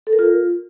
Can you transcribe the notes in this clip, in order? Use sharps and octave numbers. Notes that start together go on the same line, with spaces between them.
A4
A#4
F4